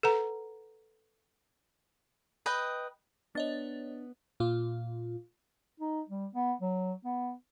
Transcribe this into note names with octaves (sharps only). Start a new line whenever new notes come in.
A4 B4 F#5 A#5
B4 D#5 G5
B3 D4 C#5 D#5 A6
A#2 F4
D#4
G3
B3
F#3
B3